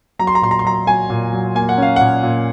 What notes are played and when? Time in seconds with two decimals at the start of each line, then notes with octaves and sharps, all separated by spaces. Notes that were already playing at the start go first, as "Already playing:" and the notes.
0.19 F#3 A#5
0.27 C6
0.35 A#5
0.42 A#2 C6
0.51 A#5
0.59 C6
0.65 F#3 A#5
0.87 F#3 G#5
1.10 A#2
1.33 F#3
1.55 A#3 G#5
1.69 F#5
1.78 C#4 F5
1.96 A#2 F#5
2.23 A#2